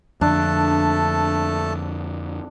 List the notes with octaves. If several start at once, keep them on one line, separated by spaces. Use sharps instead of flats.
F2 D3 A3 D4 A4 A5